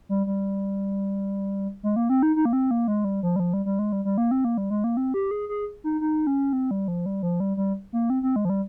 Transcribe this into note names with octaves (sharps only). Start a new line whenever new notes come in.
G3
G3
G#3
A#3
C4
D#4
D#4
A#3
C4
A#3
G#3
G3
F3
G3
F3
G3
G3
G#3
G3
G3
A#3
C4
A#3
G3
G#3
A#3
C4
G4
G#4
G#4
D#4
D#4
C#4
C4
G3
F3
G3
F3
G3
G3
A#3
C4
C4
G#3
F3
G3